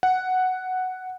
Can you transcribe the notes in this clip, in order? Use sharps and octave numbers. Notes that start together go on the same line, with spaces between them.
F#5